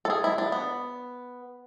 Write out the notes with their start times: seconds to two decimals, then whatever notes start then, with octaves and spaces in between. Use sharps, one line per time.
0.05 A4
0.10 G#4
0.24 E4
0.38 D4
0.52 B3